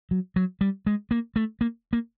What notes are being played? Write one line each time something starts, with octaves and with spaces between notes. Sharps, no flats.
F#3
F#3
G3
G#3
A#3
A3
A#3
A#3